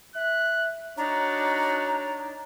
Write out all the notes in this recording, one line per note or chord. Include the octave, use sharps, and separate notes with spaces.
E5 F#6
D4 D#4 F#4 C#5 A#5